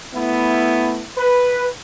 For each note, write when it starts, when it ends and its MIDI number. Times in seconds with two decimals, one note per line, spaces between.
0.14 1.03 57
0.14 1.03 59
0.14 1.03 64
1.17 1.67 71